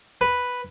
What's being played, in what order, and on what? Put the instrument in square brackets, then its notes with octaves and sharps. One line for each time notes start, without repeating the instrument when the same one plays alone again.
[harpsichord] B4